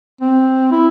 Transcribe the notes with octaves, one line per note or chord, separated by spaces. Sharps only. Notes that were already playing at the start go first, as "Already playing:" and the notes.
C4
E4